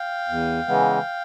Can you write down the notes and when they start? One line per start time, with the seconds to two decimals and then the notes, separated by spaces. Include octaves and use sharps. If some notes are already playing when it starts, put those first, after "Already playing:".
Already playing: F5 G5
0.29 E2
0.68 C#3 E3 G#3 B3